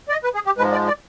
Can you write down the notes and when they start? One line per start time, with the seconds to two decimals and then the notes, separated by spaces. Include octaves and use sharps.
0.09 D5
0.12 D#5
0.24 B4
0.35 G#4
0.46 G4
0.58 G#2 F3 G#3 B4
0.72 D5
0.87 D5